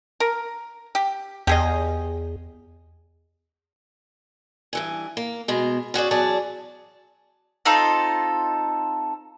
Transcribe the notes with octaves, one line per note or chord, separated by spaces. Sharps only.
A#4
G4
E2 G4 G#4 D#5
G2 E3 G#5
A#3
B2 G#3
C#4 F#4 G#4 D5
E2 F#3 G#4 D5 A5
C4 D#4 F4 A4